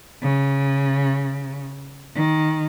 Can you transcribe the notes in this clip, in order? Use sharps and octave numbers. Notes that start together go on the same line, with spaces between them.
C#3
D#3